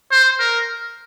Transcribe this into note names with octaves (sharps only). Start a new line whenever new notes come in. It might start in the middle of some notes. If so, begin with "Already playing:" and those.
C5
A#4